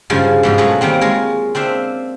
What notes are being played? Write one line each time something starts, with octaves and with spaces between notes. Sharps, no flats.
G2 C#3 F3 G#3
G#2 B2 F3
F#3 G#3 A3 B3 B4
D#3 G3 A#3 C4
G#3 F4 A#4 C#5
C4 D4 C5 E5 F5